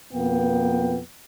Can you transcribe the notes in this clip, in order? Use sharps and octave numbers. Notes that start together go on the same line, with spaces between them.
F2 B2 A#3 B3 G5